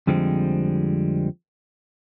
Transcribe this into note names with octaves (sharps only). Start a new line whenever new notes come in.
F2 D3 F3 G3 G#3 C4